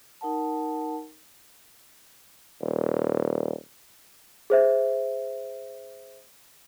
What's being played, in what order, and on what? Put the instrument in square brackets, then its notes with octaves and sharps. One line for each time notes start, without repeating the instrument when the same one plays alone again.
[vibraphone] D#4 A#4 F#5 A5
[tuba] D#1
[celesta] G#4 C5 E5